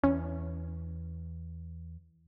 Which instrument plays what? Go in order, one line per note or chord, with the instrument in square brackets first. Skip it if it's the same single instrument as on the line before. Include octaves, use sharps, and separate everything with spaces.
[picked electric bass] E2 [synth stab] C#4